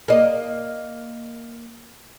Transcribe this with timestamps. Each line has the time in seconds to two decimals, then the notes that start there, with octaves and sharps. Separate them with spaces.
0.08 A#3 D#5